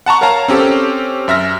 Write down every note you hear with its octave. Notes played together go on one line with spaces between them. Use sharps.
F#5 A5 A#5 C#6
A#4 C#5 F5 A5 A#5
C4 C#4 G4 A4
F#2 E5 F6 A#6